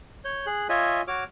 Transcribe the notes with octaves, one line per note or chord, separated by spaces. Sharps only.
C#5 G6
G#4 F#6
F4 C#5 D#5 E5 G#5
F#4 C#5 D6 F6